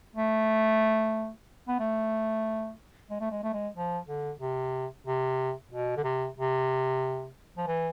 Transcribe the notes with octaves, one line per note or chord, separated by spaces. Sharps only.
A3
B3
A3
G#3
A3
G#3
A3
G#3
F3
D3
C3
C3
B2
D3
C3
C3
F3
E3